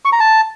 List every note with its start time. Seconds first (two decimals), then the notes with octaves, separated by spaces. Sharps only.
0.05 C#6
0.12 A#5
0.20 A5